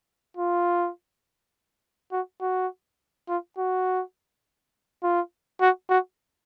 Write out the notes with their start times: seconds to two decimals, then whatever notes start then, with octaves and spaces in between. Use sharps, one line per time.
0.37 F4
2.12 F#4
2.41 F#4
3.29 F4
3.58 F#4
5.03 F4
5.61 F#4
5.90 F#4